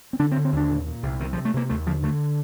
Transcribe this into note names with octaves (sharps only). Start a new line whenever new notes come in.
C4
D3 D4
C4
D3
C4
D#2 D4
A#2
A#2
C2
C3 D#3
F3
C3
A3
C3 A#3
D#2 A3
D3 F3
D3 A3